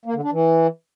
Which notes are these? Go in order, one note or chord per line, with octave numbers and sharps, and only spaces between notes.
A#3
D3
D4
E3